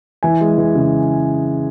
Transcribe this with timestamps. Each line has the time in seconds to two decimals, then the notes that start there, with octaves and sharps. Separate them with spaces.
0.23 E3 G#5
0.41 G#3
0.58 E3
0.75 C#3